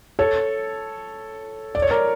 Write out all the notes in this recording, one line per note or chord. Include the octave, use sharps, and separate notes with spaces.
A4 C#5
D5
C#5
A#4 D5